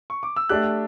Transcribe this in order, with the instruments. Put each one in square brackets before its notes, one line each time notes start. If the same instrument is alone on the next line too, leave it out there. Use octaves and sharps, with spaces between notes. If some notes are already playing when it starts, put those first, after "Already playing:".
[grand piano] C#6
D6
E6
[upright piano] A3 D4 G4 [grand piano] F#6